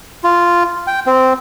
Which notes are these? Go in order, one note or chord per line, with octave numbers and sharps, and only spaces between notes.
F4
G5
C4